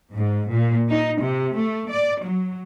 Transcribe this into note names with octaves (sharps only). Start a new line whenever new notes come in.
G#2
A#2
D#4
C3
A3
D5
F#3